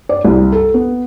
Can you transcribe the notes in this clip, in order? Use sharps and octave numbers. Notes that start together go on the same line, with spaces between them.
D5
C2
A4
B3